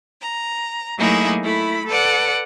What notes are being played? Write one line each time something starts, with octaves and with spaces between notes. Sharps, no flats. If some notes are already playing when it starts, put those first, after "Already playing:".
A#5
F#3 A3 A#3 D#4 E4 G#4
A3 E4 B5
A4 B4 D5 F#5